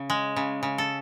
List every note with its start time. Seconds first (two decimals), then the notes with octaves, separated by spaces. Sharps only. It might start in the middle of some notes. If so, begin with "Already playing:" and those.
Already playing: C#3
0.10 G#3
0.36 C#3
0.63 C#3
0.78 A4